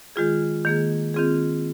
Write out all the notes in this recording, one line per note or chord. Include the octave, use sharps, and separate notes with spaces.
D#3 G#3 F4 G#4
D#3 A#3 G#4
D#3 C4 F4 G#4